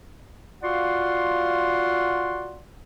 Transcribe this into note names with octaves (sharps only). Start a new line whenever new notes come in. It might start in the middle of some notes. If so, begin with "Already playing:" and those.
F4 F#4 D5 F5 F#5 C6